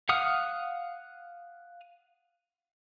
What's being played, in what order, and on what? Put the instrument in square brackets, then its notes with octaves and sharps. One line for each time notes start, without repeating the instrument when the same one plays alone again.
[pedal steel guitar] F5 F#5 D#6 F6